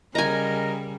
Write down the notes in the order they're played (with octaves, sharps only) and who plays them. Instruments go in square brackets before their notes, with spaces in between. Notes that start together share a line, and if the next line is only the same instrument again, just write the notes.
[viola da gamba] C#3 G3 [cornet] A#4 [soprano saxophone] D#5 [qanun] G#5 A#5